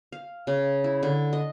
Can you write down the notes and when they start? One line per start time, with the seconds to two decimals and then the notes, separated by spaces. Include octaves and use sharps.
0.12 F5
0.47 C#3
0.84 E4
1.03 D3
1.33 D#5